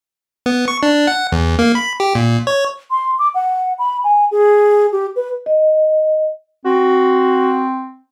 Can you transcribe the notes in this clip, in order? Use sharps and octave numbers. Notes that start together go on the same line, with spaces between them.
B3
C#6
D4
F#5
E2
A#3
B5
G4
A#2
C#5
C6
D6
F#5
B5
G#5
G#4
G4
B4
D#5
C4 F#4